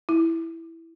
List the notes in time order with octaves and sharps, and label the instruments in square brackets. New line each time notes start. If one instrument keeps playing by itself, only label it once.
[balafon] E4